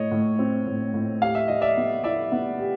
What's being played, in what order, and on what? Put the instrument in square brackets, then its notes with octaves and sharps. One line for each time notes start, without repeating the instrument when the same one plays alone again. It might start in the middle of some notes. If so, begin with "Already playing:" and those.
Already playing: [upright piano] A2 [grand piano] C#5 D#5
[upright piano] A2
C4
A2
A2
[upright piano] G4 [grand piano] F5
[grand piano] E5
[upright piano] G3 [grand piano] D#5
[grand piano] D5 E5
[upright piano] B3
[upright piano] E4 [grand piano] D5 E5
[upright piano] B3
G4